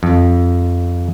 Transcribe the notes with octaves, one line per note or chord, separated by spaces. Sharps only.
F2